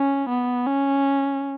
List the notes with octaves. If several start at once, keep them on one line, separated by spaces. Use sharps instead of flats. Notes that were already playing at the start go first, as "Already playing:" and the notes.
Already playing: C#4
B3
C#4